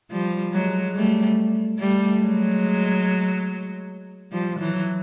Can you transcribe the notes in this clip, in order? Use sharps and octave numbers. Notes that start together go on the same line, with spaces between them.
F3 G3
F#3 G#3
G3 A3
G3 A3
F#3 G#3
F3 G3
E3 F#3